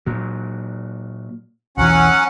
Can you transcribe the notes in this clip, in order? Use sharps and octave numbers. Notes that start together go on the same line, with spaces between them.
A#2 F#3
B1 E2 E3 F#3 C#4 F#5